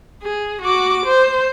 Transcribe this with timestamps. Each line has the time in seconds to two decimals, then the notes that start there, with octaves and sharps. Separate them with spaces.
0.22 G#4
0.61 F#4 D6
1.06 C5